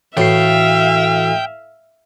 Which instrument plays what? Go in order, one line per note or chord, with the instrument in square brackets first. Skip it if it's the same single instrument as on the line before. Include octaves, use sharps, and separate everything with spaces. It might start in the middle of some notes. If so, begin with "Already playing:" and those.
[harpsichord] A2 [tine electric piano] E3 F#4 C7 [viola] E5 F5 [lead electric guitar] G5